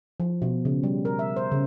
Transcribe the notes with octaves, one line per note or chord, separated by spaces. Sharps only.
F3
B2
C#3
G3
A#4
E5
C5
C#3